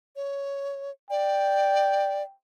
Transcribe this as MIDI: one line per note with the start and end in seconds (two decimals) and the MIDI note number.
0.16 0.91 73
1.11 2.23 74
1.11 2.35 79